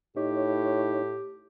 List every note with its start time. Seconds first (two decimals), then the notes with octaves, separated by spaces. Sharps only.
0.16 A2 D#4 G4 C#5